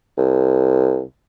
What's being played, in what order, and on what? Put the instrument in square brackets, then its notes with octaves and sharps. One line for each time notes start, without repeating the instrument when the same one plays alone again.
[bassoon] C2